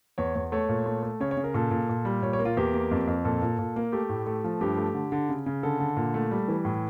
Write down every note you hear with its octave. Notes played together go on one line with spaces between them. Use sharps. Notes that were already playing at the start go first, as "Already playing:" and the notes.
E2 C#5
E2
A3 C#5
A#2
A3
A3
C#3 C#5
C#5
C#3
A#4
A#2 A4
A#2
A#2
G3
A#2 C#5
C#5
A#3
F4
E2 G4
A#3
F2
F2
A#2 A4
A#2
A#2
A#3
A3 G4
A2
A3
F3
G2 G4
A3
D3
D3
C#3
C#3
D3 A4
D3
A#2
A3
G3
E3
A2